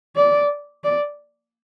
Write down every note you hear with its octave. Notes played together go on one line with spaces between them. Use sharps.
D5
D5